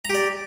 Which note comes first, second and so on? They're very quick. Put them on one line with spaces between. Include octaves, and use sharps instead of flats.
A#5 G4 D5